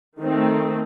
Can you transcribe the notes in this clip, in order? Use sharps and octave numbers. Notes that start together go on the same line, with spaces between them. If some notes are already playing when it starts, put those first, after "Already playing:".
D#3 A3 C4